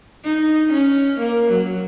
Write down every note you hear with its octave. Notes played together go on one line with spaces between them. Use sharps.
D#4
C#4
A#3
F#3